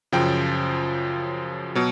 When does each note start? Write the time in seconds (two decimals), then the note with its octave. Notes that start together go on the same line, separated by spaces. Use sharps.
0.12 F#2 C#3 F3 G5
1.75 B2 F#3